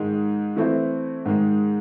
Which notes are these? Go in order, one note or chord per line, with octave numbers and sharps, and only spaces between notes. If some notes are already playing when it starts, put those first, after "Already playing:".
Already playing: G#2 D#3 G#3
E3 A3 C4 E4
G#2 D#3 G#3